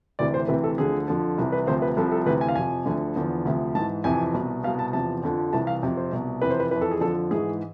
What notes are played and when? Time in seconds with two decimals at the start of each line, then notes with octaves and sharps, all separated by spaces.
0.19 D2 C3 E3 D5
0.34 C5
0.48 D2 C3 E3 B4
0.64 A4
0.78 D2 D3 F3 G#4
1.08 F2 D3 F3
1.38 C2 C3 E3
1.52 B4
1.67 D2 C3 F3 C5
1.82 B4
1.97 C2 C3 F3 A4
2.12 A4
2.26 D2 C3 E3 B4
2.41 G#5
2.49 F5
2.56 F2 C3 F3 G#5
2.86 D2 D3 F3
3.16 E2 D3 F3
3.45 D2 C3 F3
3.75 G#2 A5
3.79 E3
4.04 F2 C3 E3 G#5
4.34 C2 B2
4.64 B2 F5
4.67 C2
4.79 A5
4.93 E2 C3 F3 A5
5.23 F2 D3 F3
5.53 C2 C3 E3 A5
5.67 F5
5.83 F2 C3 F3
5.97 C5
6.12 C2 B2
6.42 F2 C3 E3 B4
6.50 C5
6.60 B4
6.71 F2 E3 B4
6.81 A4
6.91 G#4
7.01 F2 D3 F3 A4
7.31 G#2 E3 G#4